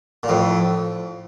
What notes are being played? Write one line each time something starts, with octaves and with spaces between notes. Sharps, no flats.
A#2
F2 A2